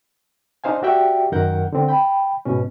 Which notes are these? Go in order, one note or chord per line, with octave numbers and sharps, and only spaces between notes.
D4 D#4 C5 F5 G#5
F#4 G4 D5 E5 G5
F#2 D#3 F#3 A#4 F#5 G6
D3 C4
G5 B5
G#2 B2 C#4